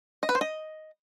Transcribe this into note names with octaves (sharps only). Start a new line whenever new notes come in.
D#5
B4
C5
D#5